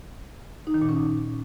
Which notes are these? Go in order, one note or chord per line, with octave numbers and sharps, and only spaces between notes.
D#4
D#3
A#2
C#4
D#4